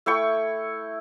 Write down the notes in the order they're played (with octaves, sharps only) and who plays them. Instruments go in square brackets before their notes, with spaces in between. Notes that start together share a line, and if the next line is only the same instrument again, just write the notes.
[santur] A3 E4 G5 C#6